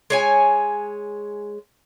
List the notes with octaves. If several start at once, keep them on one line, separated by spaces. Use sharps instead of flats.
G#3 C#5 G#5